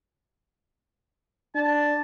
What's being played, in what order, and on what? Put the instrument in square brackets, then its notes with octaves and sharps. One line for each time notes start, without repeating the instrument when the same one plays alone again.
[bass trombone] D4 [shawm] A5